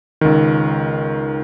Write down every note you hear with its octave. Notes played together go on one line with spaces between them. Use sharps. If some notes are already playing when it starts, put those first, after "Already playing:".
C#2 D#3